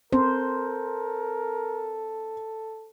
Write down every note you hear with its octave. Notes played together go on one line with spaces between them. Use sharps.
C4 A4 A#4 C5